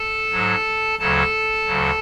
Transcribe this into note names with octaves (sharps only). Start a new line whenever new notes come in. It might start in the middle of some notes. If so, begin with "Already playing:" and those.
Already playing: A4 A5
G#2 F#3
D2 C#3 F#3 A4 A5
D2 C#3 F#3